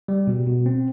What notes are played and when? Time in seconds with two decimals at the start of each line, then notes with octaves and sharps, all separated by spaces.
0.08 G3
0.27 B2
0.47 B2
0.66 C4